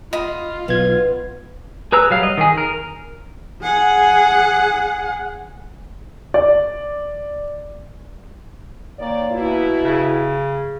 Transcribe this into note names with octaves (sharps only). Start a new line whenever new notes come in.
F4 D#5 B5
B1 B3 G#6
G#4 B4 A#5 E6
F#3 G3 F5
D#5
D#3 G#4
A#4
G#4 F#5
D5
D#3 A#3 C#5 D5
B2 E4
C#3